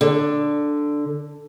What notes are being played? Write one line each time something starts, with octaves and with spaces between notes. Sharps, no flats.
D3